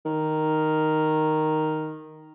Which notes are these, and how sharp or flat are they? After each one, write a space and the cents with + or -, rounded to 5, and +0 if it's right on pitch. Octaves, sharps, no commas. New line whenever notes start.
D#3 +0